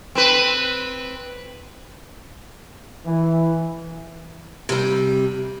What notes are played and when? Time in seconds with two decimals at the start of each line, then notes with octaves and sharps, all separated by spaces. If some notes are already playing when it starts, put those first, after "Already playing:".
0.15 C4 B4
3.06 E3
4.69 C3 G3